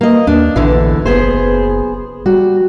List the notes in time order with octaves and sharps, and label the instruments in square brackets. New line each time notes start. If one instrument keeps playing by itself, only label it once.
[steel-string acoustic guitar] A#3 D#5
[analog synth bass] D#2 [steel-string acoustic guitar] D4
[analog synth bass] A#1 [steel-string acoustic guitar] E2 D3 E3
[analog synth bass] F#1 [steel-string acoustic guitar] B3 G#4 C5
[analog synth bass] G3 [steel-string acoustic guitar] F#4